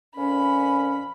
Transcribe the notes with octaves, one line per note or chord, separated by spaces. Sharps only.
F2 A#2 C#4 B5